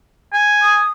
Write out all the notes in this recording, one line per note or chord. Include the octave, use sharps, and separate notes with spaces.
G#5
D#6